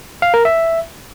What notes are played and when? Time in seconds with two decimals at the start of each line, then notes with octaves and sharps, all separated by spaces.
0.22 F5
0.34 A#4
0.45 E5